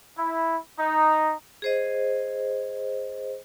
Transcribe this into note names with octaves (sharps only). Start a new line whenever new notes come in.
E4
D#4
G#4 C5 D#5